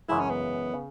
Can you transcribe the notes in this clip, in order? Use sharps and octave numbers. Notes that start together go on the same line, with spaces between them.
F#2 C#3 E3 G#3 E4
C#4
B3
C#3